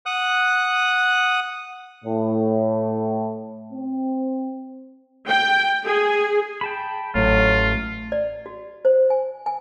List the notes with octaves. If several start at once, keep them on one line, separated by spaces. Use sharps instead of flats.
F#5 D#6 F#6
A2
C4
G5
G#4
G5 A5 B5
A1 F#3 A3 F4
D5
F#4
C5
G#5
G#5